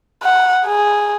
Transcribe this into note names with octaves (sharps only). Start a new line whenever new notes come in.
F#5
G#4